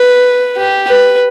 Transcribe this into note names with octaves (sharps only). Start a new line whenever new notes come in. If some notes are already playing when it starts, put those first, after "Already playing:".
Already playing: B4
G4
B4